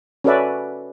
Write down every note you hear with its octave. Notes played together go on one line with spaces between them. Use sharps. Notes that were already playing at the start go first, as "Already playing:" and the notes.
C#4 F#4 A4 B4 D5 E5